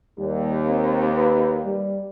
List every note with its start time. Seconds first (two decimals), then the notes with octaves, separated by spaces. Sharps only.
0.19 D#2 G3
0.67 C4
1.17 B4
1.65 G3